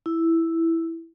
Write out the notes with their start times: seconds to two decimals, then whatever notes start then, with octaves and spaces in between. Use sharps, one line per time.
0.06 E4